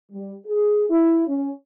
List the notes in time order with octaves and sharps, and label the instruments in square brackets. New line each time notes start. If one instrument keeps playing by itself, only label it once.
[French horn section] G3
G#4
E4
C#4